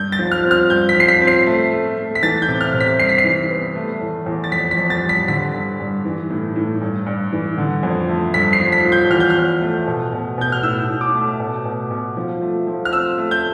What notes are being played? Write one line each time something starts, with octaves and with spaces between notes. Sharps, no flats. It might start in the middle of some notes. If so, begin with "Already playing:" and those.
Already playing: G2 G6
A6
F3
F6
C4
F6
G2 G6
B6
F3 C7
B6
C4
C7
A3
A3
A3
B6
E3 A6
G6
C3
F6
C3
B6
G2 C7
B6
C7
E3
B3
A3
E2
E2
A6
F2 B6
B6
F2
A6
G3
B6
D3 B6
G2
G2
E3
A2
A2
G2
G2
E3
D3
F2
A3
G2 B6
C7
F3
B6
F3
G6
E2 F6
G6
F6
E2
A3
B2
B2
B2 G6
F6
A2 E6
A2
D6
A3
B2
B2
B2
F3
A3
F3
F6
C4 E6
A3
G6